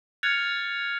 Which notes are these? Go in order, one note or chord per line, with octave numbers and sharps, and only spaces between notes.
F6 F#6 G#6 A6 C#7 F7